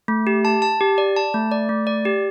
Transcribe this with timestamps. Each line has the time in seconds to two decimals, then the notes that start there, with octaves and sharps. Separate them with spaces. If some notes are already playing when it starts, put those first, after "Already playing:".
0.08 A3
0.27 G4
0.45 A5
0.62 A5
0.81 G4
0.98 D5
1.16 A5
1.34 A3
1.52 D5
1.69 A3
1.87 D5
2.05 G4